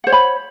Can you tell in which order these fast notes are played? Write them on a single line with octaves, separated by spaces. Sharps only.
F#5 C5 C#5 B5